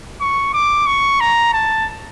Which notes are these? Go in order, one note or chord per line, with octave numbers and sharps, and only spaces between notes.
C#6
D6
C#6
A#5
A5